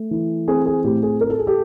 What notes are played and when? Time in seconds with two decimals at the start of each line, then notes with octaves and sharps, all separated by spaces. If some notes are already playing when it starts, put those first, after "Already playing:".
Already playing: A3
0.11 E3
0.48 C4 G#4
0.66 G#4
0.84 A2 G4
1.03 G#4
1.21 A3 A#4
1.30 A4
1.38 G#4
1.47 G4 A4